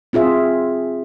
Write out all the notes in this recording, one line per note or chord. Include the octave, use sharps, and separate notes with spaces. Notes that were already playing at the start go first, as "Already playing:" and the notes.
C4 F4 G#4 E5